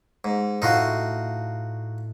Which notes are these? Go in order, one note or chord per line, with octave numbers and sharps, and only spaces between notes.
G#2
A2 D#4 F4 F#4